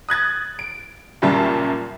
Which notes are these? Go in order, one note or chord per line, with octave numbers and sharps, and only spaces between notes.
D#6 F#6 G#6 A6
D7
F#2 A#2 C#3 G3 E5 A5